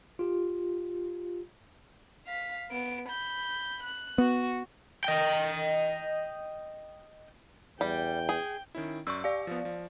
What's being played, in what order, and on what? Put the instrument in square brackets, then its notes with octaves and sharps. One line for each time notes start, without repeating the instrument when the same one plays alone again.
[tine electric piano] F4 G4
[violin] F5 B6
B3 D7
B5 G6
F#6
[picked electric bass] B3 [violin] F#4
[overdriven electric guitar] D#5 G5
[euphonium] E2 [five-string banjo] G3 [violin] G5
[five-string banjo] G#4
[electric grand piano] D#3 C#4 E4
[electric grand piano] F#2 D5 [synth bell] C#6 E6
[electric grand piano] G4 [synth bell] D5 F5
[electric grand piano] F3 B3
F3